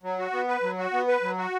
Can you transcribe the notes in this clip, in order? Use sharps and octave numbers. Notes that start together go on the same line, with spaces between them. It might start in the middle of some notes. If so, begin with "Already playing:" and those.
F#3
F#4
B3
B4
F#3
F#4
B3
B4
F#3
F#4